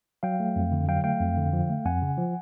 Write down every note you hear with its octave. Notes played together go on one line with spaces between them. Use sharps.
F#3 F5 G5
A3
F2
D3
F#3 F5 G5
A3 F5 G5
F2
D3
F3
A3
F2 F#5 G#5
C#3
F3